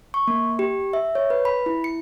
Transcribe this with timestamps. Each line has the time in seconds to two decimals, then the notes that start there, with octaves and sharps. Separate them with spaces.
0.14 C#6
0.28 A#3
0.59 G4
0.93 E5
1.15 C#5
1.30 B4
1.45 B5
1.66 E4
1.84 C#7